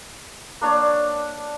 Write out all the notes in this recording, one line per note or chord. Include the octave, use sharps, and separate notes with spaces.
A#3 D4 C#5 D5